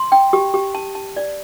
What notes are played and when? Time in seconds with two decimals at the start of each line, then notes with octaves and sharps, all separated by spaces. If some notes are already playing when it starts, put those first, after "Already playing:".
Already playing: C6
0.12 G5
0.33 G4
0.54 G4
0.75 A5
0.95 A5
1.17 D5